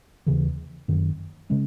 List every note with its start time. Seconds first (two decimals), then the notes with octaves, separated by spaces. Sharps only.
0.26 D#2 C#3 E3
0.88 F#1 F#2 D#3
1.50 C#3 G#3 C#4